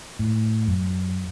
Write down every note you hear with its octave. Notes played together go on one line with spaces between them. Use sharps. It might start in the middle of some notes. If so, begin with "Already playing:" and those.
A2
F#2